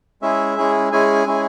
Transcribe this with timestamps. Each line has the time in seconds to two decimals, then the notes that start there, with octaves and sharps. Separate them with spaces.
0.22 G#3 C#4 E4 G#4 E5
0.57 G#3 C#4 E4 G#4
0.92 G#3 C#4 E4 G#4 G#5
1.27 G#3 C#4 E4 G#4